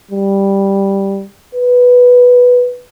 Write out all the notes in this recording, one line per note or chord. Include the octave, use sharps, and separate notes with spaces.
G3
B4